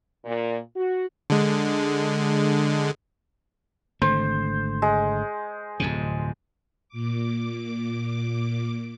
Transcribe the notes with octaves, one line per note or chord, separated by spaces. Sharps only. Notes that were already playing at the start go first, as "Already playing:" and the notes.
A#2
F#4
D3 G#3
G#1 D3 A3 C5
G#3
D1 F2 C3
A#2 D6